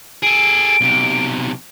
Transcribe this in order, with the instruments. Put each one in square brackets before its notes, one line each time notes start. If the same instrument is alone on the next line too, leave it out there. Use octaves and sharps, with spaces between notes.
[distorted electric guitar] G#4 A4 [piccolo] D7
[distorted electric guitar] B1 C3